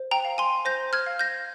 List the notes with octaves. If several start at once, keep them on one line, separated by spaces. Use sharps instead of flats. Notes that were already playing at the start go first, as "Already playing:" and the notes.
Already playing: C5
G5 A#5
F5
G#5 C6
C5 G6 A#6
F6 G#6
F5
G6 A#6